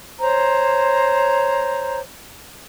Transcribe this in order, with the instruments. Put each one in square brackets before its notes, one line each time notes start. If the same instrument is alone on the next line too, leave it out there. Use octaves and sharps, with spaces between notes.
[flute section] C5 C#5 A#5